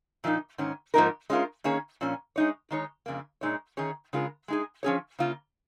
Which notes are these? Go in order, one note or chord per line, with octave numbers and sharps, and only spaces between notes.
A#2 F3 A#3 D#4
G#2 D#3 C#4
G#2 F3 A#3 D#4 A#4
G#3 C#4 F4 A#4
D#3 A#3 C#4 G#4 C#5
A#2 F3 C#4
G#3 D#4 C#5
D#3 G#3 D#4 C#5
F2 C#3 A#3
A#2 G#3 D#4 C#5
D#3 C#4 G#4 C#5
C#3 G#3 F4 A#4
G#3 D#4 G#4
F3 C#4 G#4 C#5
C#3 A#3 F4